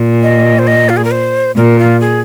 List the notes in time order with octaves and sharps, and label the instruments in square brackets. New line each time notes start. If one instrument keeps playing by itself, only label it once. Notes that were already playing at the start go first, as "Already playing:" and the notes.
Already playing: [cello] A#2
[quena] D#5
C5
D#5
F4
G#4
A#4
C5
[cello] A#2 [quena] A#4
[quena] F4
G#4